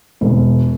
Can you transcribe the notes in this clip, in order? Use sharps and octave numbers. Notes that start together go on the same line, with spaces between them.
E1